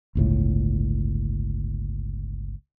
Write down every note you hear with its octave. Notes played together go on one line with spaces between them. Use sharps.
G1 C#2 A2